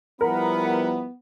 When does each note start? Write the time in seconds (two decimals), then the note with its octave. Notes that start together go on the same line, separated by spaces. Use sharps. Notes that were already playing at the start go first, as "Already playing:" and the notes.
0.21 F3 G3 B3 E4 A#4 F#5 B5